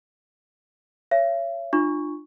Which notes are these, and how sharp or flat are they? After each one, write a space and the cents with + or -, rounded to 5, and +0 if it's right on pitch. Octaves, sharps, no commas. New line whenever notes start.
C#5 +0 E5 +45
D4 +35 F4 +0 C#6 +0